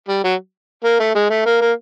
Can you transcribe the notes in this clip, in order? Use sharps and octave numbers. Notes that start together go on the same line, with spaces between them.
G3
F#3
A#3
A3
G#3
A3
A#3
A#3